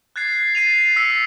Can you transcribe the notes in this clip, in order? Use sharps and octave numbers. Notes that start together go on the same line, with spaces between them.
F#6 G#6 A6 C7
A6 C7 D#7 F7
E6 B6 C#7